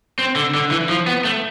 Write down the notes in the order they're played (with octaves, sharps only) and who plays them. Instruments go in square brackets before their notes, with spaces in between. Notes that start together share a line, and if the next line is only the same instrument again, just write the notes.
[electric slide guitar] C4
D3
D3
E3
F3
B3
A3